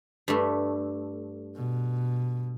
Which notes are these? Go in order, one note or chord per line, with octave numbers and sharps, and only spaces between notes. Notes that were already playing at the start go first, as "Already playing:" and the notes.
G2 A3
B2